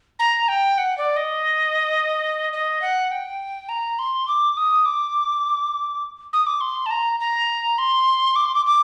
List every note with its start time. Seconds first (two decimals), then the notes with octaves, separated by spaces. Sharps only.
0.19 A#5
0.48 G5
0.78 F#5
0.97 D5
1.16 D#5
2.53 D#5
2.81 F#5
3.11 G5
3.69 A#5
3.98 C6
4.28 D6
4.57 D#6
4.85 D6
6.33 D#6
6.46 D6
6.60 C6
6.86 A5
6.90 A#5
7.20 A#5
7.78 C6
8.35 D6
8.45 C6
8.54 D6
8.66 D6